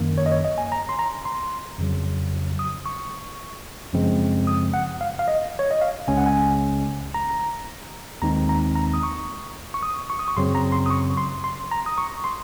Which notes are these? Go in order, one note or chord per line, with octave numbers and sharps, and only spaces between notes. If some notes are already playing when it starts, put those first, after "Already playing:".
Already playing: F#2 D#3 A#3
C#5
D#5
C#5
D#5
G#5
A#5
C6
A#5
C6
F2 C#3 F#3
D#6
C#6
F#2 C#3 F3 G#3 C4
D#6
F#5
F5
F5
D#5
C#5
D#5
F5
C#2 C#3 G#3 C#4 G#5
F#5
G#5
A#5
D#2 D#3 G#3 C4 D#4 A#5
A#5
A#5
D#6
C#6
C#6
D#6
C#6
D#6
C#6
F#2 C#3 F#3 C4 C6
A#5
C6
D#6
C#6
C6
C6
A#5
D#6
C#6
C6